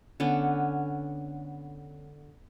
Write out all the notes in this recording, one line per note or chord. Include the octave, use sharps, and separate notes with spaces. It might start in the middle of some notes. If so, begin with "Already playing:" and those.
D3 B3 C#4